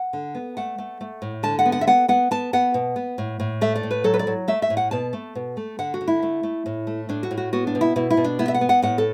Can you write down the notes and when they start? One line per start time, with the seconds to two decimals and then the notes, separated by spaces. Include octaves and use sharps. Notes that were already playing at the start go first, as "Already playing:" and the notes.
Already playing: F#5
0.13 D3
0.35 B3
0.57 A3 F#5
0.78 A3
1.01 A3
1.22 A2
1.43 D3 A5
1.59 F#5
1.65 B3
1.72 F#5
1.81 E5
1.87 B3 F#5
2.08 B3 F#5
2.31 B3 A5
2.53 B3 F#5
2.74 B2
2.96 B3
3.18 A2
3.40 A2
3.61 A3 E5
3.76 D5
3.83 A2
3.91 B4
4.04 F#3 A4
4.14 B4
4.19 D5
4.27 F#3
4.48 A3 E5
4.62 E5
4.70 A2
4.77 F#5
4.91 B2 A5
5.13 A3
5.35 B2
5.57 A3
5.79 D3 F#5
5.94 F#4
6.01 D3
6.08 E4
6.23 A3
6.43 A3
6.66 A2
6.87 A3
7.09 A2 D4
7.23 F#4
7.31 A2
7.37 F#4
7.53 B3 F#4
7.67 D4
7.75 B2
7.81 E4
7.96 B2 E4
8.10 E4
8.17 B2
8.24 D4
8.39 B3 E4
8.48 E5
8.54 F#5
8.61 B3
8.69 F#5
8.82 A2 F#5
8.98 A4